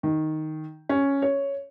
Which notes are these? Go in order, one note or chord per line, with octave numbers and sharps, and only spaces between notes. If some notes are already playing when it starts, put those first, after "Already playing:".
D#3
C#4
C#5